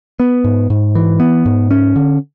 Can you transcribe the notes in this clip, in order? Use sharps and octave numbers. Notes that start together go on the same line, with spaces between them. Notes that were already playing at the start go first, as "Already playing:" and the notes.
B3
G#2
G#2
E3
B3
G#2
C#4
D3